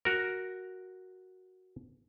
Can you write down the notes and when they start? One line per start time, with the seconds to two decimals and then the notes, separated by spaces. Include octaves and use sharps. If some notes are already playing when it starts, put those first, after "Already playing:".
0.05 F#4 A#4